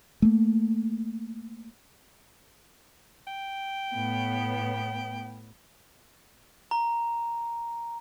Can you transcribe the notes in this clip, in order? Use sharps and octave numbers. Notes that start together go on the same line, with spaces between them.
A3 A#3
G5
A2 B3
A#5